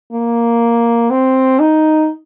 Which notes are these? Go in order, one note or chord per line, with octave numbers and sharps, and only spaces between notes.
A#3
C4
D#4